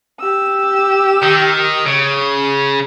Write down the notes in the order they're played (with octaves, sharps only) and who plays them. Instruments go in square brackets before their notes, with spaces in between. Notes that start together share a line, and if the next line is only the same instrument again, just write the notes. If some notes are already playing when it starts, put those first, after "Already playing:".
[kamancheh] G4 E6
[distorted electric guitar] D#3
C#3